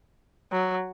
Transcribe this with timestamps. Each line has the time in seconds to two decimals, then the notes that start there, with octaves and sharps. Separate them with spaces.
0.52 F#3